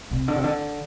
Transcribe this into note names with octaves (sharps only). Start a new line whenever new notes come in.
C3
D3
C3
D3